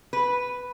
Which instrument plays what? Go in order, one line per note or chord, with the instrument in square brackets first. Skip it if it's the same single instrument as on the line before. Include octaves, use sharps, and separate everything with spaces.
[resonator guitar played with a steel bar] B4